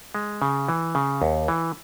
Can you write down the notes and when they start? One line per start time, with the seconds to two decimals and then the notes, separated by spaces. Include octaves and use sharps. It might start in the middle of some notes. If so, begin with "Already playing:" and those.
0.15 G#3
0.42 C#3
0.69 E3
0.95 C#3
1.22 D#2
1.48 E3